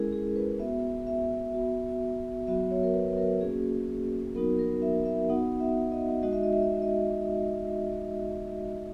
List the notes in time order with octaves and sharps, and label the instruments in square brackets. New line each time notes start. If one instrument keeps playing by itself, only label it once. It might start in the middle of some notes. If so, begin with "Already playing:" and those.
Already playing: [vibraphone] G#3 C#4 E4 G#4 A#4
G#4
B4
B3 F#4 E5
E5
B3 F#4
F#3 B3 F#4 E5
C#5
A#4
B4
A#4
A#3 C#4 F#4 G#4
F#3 B3 D#4 F#4 A#4
A#4
E5
E5
B3 D#4 F#4 F#5
E5
D#5
G#3 D#4 F#4 D#5
E5
D#5
E5
D#5
E5
D#5